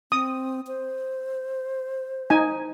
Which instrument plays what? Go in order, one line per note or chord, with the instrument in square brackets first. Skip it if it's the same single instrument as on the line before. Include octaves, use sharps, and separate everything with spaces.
[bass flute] C4 [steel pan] D#6
[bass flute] C5
[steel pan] D#4 G#5